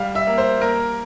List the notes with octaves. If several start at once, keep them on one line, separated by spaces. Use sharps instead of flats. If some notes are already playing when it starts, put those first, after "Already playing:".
Already playing: G3 F5
E5
A#3
C5
A#3 A#4